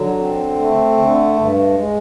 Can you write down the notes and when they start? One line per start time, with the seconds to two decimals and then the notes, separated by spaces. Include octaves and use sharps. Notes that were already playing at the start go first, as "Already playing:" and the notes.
Already playing: D3 F#3
0.19 C4
0.58 A3
0.98 D3
1.36 G2
1.76 G#3